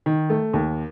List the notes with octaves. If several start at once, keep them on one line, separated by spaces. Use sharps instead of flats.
D#3
A3
D#2